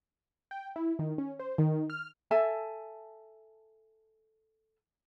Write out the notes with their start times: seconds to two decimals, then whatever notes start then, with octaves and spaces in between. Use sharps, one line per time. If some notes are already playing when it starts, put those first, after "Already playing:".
0.51 G5
0.76 E4
0.99 D#3
1.18 C#4
1.39 C5
1.58 D#3
1.90 F6
2.31 A4 E5 G#5 A5